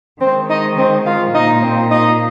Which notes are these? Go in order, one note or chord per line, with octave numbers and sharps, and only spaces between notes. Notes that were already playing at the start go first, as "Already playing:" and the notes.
D#3 G#3 C4 C5
D#4 D#5
C4 C5
F4 F5
A#2 A#3 D#4 D#5
C4 C5
D#4 D#5